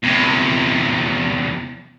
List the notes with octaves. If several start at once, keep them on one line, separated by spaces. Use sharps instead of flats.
E2 C3